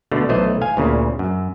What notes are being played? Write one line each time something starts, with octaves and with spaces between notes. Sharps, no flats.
B2 D3 A3
B1 E3 A3 C5 D#5
F5 G#5
D2 A#2 C#3
F#2